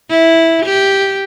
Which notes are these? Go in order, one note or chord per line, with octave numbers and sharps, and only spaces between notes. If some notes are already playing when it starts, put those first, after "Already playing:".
E4
G4